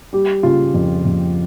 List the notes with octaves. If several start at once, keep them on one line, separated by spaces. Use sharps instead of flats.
G3 G4
C#3 F4
F2
F2